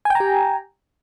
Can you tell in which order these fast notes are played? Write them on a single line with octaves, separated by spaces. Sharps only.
G#5 G5 A#5 G4